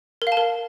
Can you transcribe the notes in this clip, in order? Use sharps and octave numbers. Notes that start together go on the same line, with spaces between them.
A#4
F5
A5
A#4